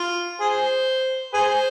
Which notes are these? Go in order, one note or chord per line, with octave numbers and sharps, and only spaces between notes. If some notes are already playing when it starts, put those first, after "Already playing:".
Already playing: F4
G#4 C5
G#4 C5